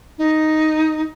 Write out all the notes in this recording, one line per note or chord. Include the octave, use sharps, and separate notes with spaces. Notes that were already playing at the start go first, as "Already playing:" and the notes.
D#4